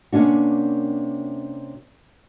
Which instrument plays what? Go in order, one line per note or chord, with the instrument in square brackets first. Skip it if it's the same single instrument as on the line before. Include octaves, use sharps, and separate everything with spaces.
[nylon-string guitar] C3 A#3 C#4 D4 F#4